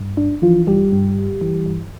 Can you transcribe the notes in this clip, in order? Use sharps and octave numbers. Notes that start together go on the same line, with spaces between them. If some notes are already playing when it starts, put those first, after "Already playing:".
Already playing: G2
G1 D4
E3 F3 F4
G1 G3 G4
G2
G1
E3
G1